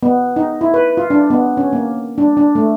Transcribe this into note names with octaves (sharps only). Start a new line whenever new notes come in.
B3
D#4
E4
B4
F4
D4
B3
C#4
A#3
D4
D4
A3